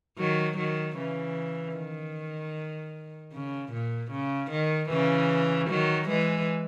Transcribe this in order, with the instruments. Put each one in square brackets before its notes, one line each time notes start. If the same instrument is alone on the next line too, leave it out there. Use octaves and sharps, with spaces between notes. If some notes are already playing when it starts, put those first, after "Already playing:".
[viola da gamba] D#3 F#3
D#3 F#3
C#3 E3
D#3
C#3
A#2
C#3
D#3
C#3 E3
D#3 F#3
E3 G#3